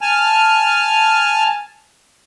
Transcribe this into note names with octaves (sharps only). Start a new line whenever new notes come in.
G#5 A5 F6